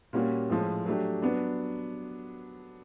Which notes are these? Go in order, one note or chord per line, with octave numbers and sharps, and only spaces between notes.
A#2 G3 A#3 C#4 F#4
A2 F3 G#3
F#3 A3 D4 G4
F#3 B3 D4